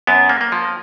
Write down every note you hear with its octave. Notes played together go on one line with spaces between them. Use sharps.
F#2 B3
A#3
A#3
F3